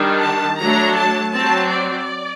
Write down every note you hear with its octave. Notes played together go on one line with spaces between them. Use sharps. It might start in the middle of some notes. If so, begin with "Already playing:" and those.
Already playing: D#3 G3 D4
A5
F#3 A3 D4 A#5
A5
F#3 C4 A5
D5